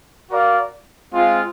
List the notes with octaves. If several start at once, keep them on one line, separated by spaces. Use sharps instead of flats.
F#4 A#4 D5 F5
G#3 C4 F4